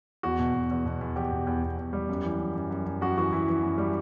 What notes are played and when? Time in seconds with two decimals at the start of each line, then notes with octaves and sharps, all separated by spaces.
0.23 E2 F#4
0.39 B2
0.54 B2
0.71 E2
0.86 B2
1.01 E2
1.16 E2 G4
1.32 B2
1.47 E2
1.63 E2
1.77 E2
1.93 G3
2.09 F#2
2.24 E3
2.40 F#2
2.56 F#2
2.71 F#2
2.86 F#2
3.01 F#2 F#4
3.17 E3 F#4
3.32 E3 E4
3.48 E3
3.63 F#2
3.78 G3